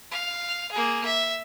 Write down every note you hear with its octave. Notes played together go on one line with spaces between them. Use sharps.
F5
A#3 G#4
E5